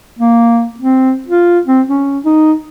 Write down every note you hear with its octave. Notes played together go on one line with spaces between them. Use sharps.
A#3
C4
F4
C4
C#4
D#4